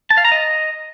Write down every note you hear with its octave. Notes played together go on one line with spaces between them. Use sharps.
A5
F5
A#5
D#5